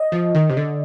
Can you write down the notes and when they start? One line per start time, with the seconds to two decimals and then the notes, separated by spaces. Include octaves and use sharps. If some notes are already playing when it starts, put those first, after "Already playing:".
Already playing: D#5
0.12 F3
0.35 D#3
0.50 C3
0.57 D3